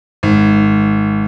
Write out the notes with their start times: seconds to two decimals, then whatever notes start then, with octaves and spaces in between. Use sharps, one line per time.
0.23 G#1